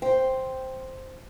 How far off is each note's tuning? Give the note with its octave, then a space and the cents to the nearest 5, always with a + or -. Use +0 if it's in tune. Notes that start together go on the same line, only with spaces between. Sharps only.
C5 +0 G5 +0